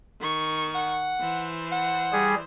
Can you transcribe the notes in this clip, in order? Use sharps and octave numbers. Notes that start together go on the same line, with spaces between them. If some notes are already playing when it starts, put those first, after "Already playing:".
D#3 C#6
F#5
E3 C5
F#5
G3 G#4